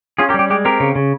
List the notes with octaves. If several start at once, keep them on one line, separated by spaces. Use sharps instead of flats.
C#4 F4 G#4
G4 A#4
G3
G4
G#3 G4
C4 G4 A#4
C#3
C#3